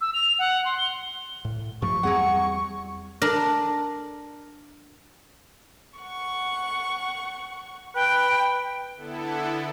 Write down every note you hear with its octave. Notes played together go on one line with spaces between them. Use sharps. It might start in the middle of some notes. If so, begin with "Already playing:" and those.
E6
F7
F#5
C6
G7
A2
G2 F3 A3 C#6
E2 F#3 G3 C4 G#4 F#5
D4 A#4
F#5 C#6
B4 G5
D3 B3 E4 A4